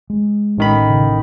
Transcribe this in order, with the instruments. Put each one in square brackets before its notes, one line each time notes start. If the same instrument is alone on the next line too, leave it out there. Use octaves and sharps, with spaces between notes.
[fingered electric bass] G#3
[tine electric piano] A1 D#3 B5
[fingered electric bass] C#3